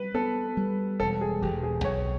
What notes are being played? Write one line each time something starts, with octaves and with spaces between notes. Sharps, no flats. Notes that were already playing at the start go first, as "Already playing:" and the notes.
Already playing: G3 B4
B3 A4
G3
E1 A4
G#4
E1 G4
G#4
B1 C#5